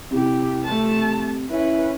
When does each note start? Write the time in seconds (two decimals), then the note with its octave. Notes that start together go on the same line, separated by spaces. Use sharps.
0.11 C3 E4 G4
0.64 A3 A5
1.50 C#4 E4 B4